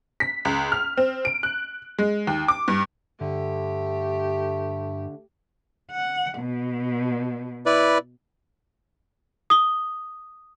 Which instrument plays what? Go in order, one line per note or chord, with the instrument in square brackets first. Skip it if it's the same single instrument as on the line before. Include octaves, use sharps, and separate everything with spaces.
[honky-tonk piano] B6
C#2
F6
C4
D7
F#6
G#3
D#2
D6
G2
[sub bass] G2 [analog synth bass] D3 [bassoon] A3 [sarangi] G4
[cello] F#5
B2
[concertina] E4 B4 D5
[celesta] D#6 G7